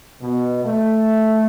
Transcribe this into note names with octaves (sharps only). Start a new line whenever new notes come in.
B2
A3